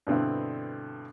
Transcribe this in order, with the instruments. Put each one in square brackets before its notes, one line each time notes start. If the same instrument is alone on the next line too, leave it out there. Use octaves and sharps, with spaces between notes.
[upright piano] G2 B2 D3 C4 E4